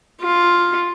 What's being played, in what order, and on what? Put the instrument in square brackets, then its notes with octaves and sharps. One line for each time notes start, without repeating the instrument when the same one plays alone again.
[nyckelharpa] F4